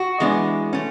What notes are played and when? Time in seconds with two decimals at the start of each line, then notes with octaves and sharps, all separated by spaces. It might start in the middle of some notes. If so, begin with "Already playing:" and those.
Already playing: F#4
0.20 E3 G#3 B3 D4
0.73 A3 C#4